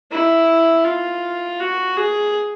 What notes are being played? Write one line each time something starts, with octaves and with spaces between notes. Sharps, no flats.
E4
F4
F#4
G#4